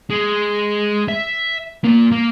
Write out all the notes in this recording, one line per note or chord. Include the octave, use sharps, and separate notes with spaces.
G#3
E5
A#2 A#3
A#3